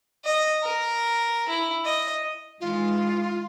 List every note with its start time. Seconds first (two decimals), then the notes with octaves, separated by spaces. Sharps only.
0.25 D#5
0.63 A#4
1.49 E4
1.85 D#5
2.60 D#3 E3 G#3 F4